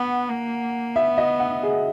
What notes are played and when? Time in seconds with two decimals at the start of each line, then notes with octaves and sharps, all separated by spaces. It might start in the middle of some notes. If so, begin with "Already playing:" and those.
Already playing: B3 F#5
0.29 A#3
0.96 B3 E5
1.18 D#5
1.40 F#5
1.63 G#4